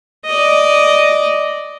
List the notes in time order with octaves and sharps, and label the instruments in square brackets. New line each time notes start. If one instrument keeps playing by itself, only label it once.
[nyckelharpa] D5 D#5